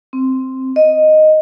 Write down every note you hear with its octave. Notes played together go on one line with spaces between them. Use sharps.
C4
D#5